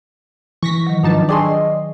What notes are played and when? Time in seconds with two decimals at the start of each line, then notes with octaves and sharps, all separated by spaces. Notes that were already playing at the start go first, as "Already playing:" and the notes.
0.63 E3 C#6 A#6 B6
0.87 D#3 F#3
1.03 G#2 F3 D4 D#4 B4 A5
1.29 D4 G#4 D#5 G5 C6 C#6 E6